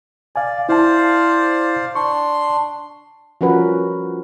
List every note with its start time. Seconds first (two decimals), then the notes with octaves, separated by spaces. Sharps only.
0.36 D5 F5 G#5
0.69 E4 C5 D5 F5 A5
1.95 D4 C6 C#6
3.41 F3 G3 C#4 F#4 A#4 B4